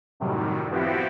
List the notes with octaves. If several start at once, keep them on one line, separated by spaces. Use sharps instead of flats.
F#2 A2 C3 D#3 F#3 G3
F3 B3 C4 E4 F#4 G4